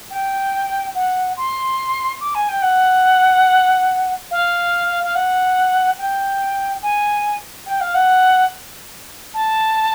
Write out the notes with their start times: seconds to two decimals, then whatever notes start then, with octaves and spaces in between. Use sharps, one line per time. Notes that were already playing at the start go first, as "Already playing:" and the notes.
0.10 G5
0.95 F#5
1.37 C6
2.21 D6
2.35 G#5
2.49 G5
2.62 F#5
4.31 F5
5.04 F5
5.15 F#5
5.98 G5
6.82 G#5
7.66 G5
7.81 F5
7.94 F#5
9.34 A5